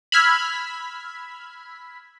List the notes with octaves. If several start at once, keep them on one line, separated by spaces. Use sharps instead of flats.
B5 E6 F6 G#6 B6